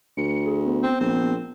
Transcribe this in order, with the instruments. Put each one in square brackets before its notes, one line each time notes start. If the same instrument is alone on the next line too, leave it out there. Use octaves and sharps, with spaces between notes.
[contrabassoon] D2 [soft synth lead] C#7
[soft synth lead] G#4
B3
[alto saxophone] C4
[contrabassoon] A#1 [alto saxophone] C4